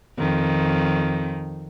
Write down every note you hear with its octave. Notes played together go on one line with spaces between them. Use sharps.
F2 D#3